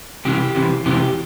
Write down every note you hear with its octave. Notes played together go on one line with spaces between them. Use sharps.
C2 C3 E3 G4
C2 C3 E3
E2 C3 E3 G4